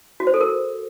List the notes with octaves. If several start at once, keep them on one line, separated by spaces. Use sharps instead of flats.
F#4
C5
A4
A#4